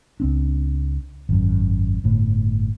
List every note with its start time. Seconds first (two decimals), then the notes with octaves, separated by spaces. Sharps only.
0.20 C#2 C4 D4
1.29 G#1 F#2
2.04 G1 A2